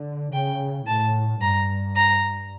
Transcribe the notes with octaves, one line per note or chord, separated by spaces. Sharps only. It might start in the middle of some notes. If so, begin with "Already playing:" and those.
Already playing: D3
C#3 G5
A2 A5
G2 A#5
A#5